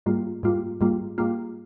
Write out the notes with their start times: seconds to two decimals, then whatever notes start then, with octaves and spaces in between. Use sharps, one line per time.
0.06 G#2 G3 A#3 F4
0.43 G#2 G3 A#3 F4
0.81 G#2 G3 A#3 F4
1.18 G#2 G3 A#3 F4